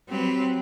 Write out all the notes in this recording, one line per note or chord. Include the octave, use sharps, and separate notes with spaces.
F#3 C4 G4 B4